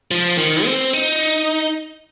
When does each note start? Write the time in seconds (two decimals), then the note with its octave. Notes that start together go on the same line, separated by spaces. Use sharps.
0.11 F3
0.38 D#3
0.65 C4
0.93 D#4